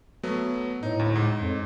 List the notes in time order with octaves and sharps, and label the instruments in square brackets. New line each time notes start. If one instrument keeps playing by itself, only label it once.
[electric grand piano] F#3 A3 B3
[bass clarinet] A2 [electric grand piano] D#4
[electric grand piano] D2
G#2
[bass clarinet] F2